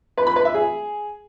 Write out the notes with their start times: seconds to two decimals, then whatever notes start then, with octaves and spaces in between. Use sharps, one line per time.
0.18 B4
0.27 B5
0.36 B4
0.45 E5
0.54 G#4